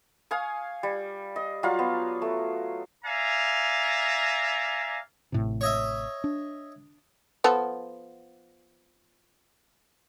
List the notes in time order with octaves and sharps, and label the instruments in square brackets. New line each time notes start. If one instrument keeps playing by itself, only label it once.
[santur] F5 G#5 C#6 D#6
G3
D#5
F#3 G3 F4 F5
B3
A3
[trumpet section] D5 E5 F5 G#5 A#5
[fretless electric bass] A1 A2 C3
[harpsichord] C#5 D#5 E5
[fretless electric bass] D4
[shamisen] F3 B3 A4